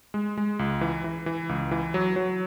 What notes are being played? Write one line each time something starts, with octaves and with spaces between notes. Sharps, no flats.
G#3
G#3
C#2
E3
E3
E3
C#2
E3
F#3
F#3